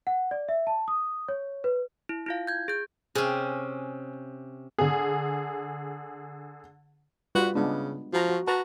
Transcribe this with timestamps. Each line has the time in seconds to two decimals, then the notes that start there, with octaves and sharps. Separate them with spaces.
0.07 F#5
0.31 D5
0.49 E5
0.67 A5
0.88 D#6
1.28 C#5
1.64 B4
2.09 E4
2.26 E4 F4 F5
2.47 G6 G#6
2.68 G#4 G6
3.15 C3 C#4 G#4
4.78 D3 G#4
7.35 G3 F4 F#4 B4
7.55 C#3 G#3 B3 D4
8.13 F3 F#4 A#5
8.29 F#4
8.47 F#4 B4 A5 A#5